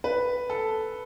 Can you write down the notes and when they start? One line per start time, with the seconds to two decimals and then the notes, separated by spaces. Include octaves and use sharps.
0.04 B4
0.50 A4